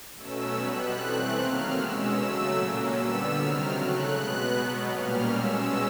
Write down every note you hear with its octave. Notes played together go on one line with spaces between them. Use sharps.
B2 F#3 A3 C#4 E6
B2 G3 B3 F#6
E3 A3 C4 F#6
C3 D#3 F#3 A#3 F6
B2 G#3 C#4 E6
C#3 F#3 A3
A#2 F#3 A#3 C#4
D3 G3 B3 E6
C3 D#3 F#3 F6
C#3 F#3 A3 F#6
B2 G#3 B3
B2 F#3 B3
A#2 G3 A#3 C#4 F6
B2 G#3 C#4 E6